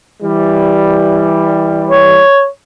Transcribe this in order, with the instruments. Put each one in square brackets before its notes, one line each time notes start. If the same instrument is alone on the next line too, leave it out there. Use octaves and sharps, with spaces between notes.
[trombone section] E3 G3
[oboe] C#5